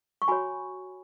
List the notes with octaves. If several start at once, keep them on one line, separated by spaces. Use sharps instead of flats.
C#6
F#4 C#5 G#5 B5